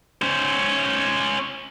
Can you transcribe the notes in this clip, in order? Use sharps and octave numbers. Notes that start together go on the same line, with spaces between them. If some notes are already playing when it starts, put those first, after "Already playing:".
C#4 C5